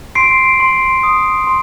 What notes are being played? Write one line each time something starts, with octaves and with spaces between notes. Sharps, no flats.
C6 C7 D7
C6
D#6
C6